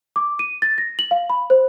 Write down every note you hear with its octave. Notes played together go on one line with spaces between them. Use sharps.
D6
D#7
A6
A#6
F#7
F5
B5
C5